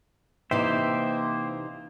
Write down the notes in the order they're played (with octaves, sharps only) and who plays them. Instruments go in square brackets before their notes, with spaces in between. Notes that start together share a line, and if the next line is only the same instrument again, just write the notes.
[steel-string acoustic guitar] C3 E3 D#4 [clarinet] A#3 [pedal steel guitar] C5 E5 G5